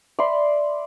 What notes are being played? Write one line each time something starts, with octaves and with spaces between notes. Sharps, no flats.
D5 E5 B5 C6